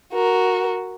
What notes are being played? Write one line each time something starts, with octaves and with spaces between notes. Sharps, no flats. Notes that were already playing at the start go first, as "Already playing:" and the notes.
F#4 A#4